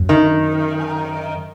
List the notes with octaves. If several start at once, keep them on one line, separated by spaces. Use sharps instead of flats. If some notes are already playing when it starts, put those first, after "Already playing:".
Already playing: F#2
D#3